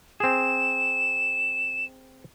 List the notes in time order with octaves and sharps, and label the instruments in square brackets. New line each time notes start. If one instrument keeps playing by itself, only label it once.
[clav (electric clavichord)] C4 G#4 [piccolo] E7